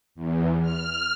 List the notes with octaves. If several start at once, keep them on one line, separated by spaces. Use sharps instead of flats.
E2
F6